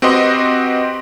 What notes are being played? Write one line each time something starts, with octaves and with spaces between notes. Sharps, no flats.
C4 F#4 G4 B4 D#5 C6